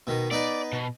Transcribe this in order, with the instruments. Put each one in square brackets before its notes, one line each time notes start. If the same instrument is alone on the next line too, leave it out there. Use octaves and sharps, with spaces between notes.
[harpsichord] B2 D#3
[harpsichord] B3 D#4 B4 [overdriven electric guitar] D5
[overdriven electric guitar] B2